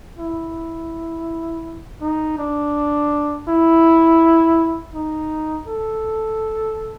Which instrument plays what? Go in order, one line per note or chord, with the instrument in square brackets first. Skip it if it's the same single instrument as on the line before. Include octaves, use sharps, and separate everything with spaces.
[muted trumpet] E4
D#4
D4
E4
D#4
A4